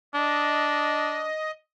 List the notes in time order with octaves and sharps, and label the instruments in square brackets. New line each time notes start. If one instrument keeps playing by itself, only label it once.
[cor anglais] D4 [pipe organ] D#5